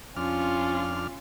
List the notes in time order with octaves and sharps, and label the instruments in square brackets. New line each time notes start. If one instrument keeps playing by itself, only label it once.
[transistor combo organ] F2 D4 F6 [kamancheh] C#4 F4